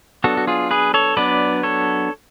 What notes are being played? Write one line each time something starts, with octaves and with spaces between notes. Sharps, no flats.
F#3 B3 D4 F#4 A4
F#4
F4 G#4
G#4 B4
A4 C#5
F#3 B3 D4 B4 D5
A4 C#5